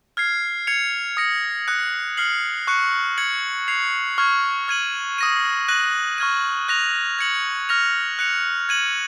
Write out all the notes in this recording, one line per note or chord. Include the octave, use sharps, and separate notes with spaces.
F6 G#6 C7
G#6 C#7 F7
D#6 A#6 C#7
D#6 F#6 C#7
F6 C7 F#7
C#6 F#6 C#7
G#6 C#7 F#7
G#6 C7 F7
C#6 F6 G#6
F6 G#6 D#7 F#7
D#6 A#6 D#7
F#6 A#6 D#7 F#7
C#6 F6 G#6 D#7
F#6 A#6 F7
G#6 C#7 F#7
F6 A#6 F7
F#6 C#7 F7
G#6 D#7 F#7